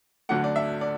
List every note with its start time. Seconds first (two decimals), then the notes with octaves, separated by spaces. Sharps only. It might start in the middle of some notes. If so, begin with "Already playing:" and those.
0.29 D2 D3 F#3 A3 F#5
0.44 D5
0.56 E5
0.81 D5